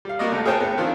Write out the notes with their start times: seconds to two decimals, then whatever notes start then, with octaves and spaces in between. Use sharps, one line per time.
0.05 G3 F5
0.19 A#3 B3 F#4 A#4 D5 D#5
0.32 C#2 A3
0.46 G#4 A#4 C5 C#5 G5 A5
0.60 B3
0.77 D#3 F3 C4 D4